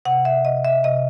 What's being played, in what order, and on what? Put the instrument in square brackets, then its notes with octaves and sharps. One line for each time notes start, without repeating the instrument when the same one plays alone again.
[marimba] C3 F#5
E5
C3 D#5
E5
C3 D#5